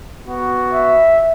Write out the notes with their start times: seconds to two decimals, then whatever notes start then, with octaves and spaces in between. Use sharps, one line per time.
0.24 B3 F#4
0.73 E5